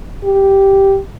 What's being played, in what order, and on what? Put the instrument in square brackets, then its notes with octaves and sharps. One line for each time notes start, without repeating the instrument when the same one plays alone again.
[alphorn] G4